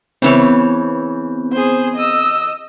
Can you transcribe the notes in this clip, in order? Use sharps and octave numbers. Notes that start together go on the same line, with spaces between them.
C#3 E3 B3 C4 C#5
G#4 C5
D#5 E6